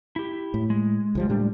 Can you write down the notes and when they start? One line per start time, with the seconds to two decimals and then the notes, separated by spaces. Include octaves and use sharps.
0.16 E4 G4
0.54 A2
0.70 G#3
1.15 C#2 F3 G3
1.29 A2 G3 D4